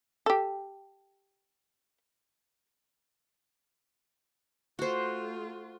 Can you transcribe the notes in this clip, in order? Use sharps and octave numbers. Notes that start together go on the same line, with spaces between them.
G4 A4
A3 F4 F#4 C5